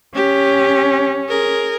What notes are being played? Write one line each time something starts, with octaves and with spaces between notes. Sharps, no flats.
C#4 G4
G#4 A#4